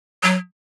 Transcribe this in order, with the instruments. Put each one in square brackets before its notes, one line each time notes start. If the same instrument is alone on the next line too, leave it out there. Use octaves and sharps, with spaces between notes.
[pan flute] F#3